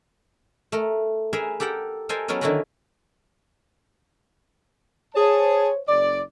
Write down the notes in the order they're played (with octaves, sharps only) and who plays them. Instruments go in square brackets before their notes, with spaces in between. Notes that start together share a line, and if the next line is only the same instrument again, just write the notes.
[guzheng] A3 A#4
G#4 A#4 B4 E5
G4 A4 A#4 F#5 G5
A4 A#4 C5 D#5 G5 G#5
F#3 B3 C#4 A4 A#4 D#5
D3 D#3 E4 F#4 A#4 B4
[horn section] G#4 A5 [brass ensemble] C5 C#5
[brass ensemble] F#1 [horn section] D5